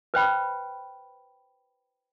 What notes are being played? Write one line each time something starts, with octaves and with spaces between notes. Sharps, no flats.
B4 C5 G5 B5